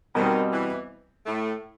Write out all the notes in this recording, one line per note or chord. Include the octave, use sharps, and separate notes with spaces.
B2 D#3 G3 C4
E3
A2 A3